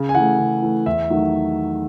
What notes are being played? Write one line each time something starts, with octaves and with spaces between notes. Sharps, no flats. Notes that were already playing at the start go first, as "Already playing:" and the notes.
Already playing: C#3
G#5
E3 A3 F#5
C#3
E3 A3
E2 E5
D#3 F#3 A3